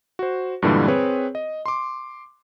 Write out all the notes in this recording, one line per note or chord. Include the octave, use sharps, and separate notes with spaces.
F#4 C5
G2 A#2 D3 E3 G3 G#3
C4 G#4 B4 C#5
D#5
C6 D6